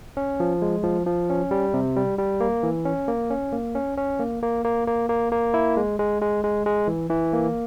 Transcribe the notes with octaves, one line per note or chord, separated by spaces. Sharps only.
C#4
F3
G#3
F3
F3
C#4
G3
C3
G3
G3
A#3
E3
C#4
A#3
C#4
A#3
C#4
C#4
A#3
A#3
A#3
A#3
A#3
A#3
E4
G#3
G#3
G#3
G#3
G#3
E3
E3
A#3